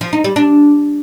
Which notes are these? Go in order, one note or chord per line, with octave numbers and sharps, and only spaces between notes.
F3
D#4
G3
D4